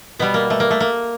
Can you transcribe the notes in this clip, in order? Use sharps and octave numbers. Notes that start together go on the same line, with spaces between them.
B2 G3 B3
A#3
A3
A#3
A3
A#3